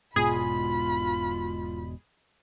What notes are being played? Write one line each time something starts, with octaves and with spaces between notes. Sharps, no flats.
E1 G#2 B2 F4 G#4 B5